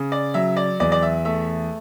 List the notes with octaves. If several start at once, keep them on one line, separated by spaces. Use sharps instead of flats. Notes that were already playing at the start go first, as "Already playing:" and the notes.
Already playing: C#3
D5
F#3 E5
D5
E2 D5
D5
E5
A3 E5